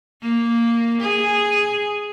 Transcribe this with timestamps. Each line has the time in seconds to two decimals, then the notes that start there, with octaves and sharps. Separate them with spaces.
0.22 A#3
1.01 G#4